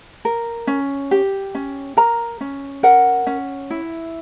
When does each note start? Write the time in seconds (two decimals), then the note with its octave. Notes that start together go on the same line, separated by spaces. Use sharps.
0.25 A#4
0.67 C#4
1.11 G4
1.55 C#4
1.97 A#4 A#5
2.41 C#4
2.83 A#4 F#5
3.27 C#4
3.70 E4